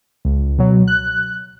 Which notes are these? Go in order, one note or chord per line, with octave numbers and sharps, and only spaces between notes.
C#2
B2 F#3
F#6